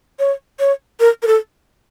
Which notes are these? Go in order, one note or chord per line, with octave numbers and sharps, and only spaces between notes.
C#5
C#5
A#4
A#4
A4